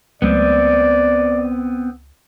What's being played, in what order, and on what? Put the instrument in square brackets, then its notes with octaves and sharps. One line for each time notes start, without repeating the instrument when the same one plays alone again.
[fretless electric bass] C#2 F#3 A3 [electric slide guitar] B3 C4 [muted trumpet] D5